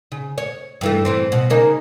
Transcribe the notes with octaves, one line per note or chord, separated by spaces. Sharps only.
C#3
C#5
G2 E3 A3
A2 E3 C4
B2
C#3 A#3 D#4